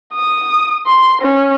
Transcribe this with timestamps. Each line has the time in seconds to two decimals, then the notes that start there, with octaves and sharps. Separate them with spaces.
0.15 D#6
0.87 C6
1.22 C#4